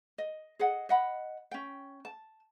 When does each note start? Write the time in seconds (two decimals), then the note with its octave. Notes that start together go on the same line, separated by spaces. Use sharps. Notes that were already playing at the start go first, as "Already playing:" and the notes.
0.18 D#5
0.59 G#4 D#5 F#5
0.89 D#5 F#5 B5
1.51 C#4 G5
2.05 A5